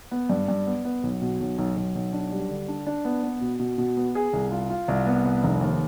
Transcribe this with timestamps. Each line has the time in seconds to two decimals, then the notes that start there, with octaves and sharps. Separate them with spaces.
0.11 B3
0.30 G2
0.48 G2
0.66 B3
0.85 B3
1.03 B1
1.22 B2
1.40 B1
1.58 B1
1.76 B1
1.95 B1
2.13 D4
2.32 G3
2.50 D3
2.68 D4
2.87 D4
3.05 B3
3.23 B3
3.41 B2
3.60 B2
3.78 B2
3.97 B3
4.15 G#4
4.33 C2
4.52 F4
4.70 F4
4.88 C2
5.06 B3
5.25 C2
5.44 F1
5.61 D#2